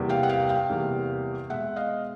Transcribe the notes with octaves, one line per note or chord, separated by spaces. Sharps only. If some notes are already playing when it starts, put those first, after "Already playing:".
Already playing: E2 C3 E3 G3 A#3
F5 G5
F#5
F5 G5
F5 G5
E2 C3 E3 G3 A#3
B2 G#3 E5 F#5
D#5 F5